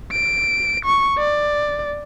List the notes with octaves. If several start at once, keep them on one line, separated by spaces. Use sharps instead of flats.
D7
C#6
D5